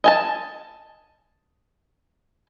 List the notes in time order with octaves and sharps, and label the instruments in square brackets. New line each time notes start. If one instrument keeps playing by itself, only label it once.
[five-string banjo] D#5 G#5 A5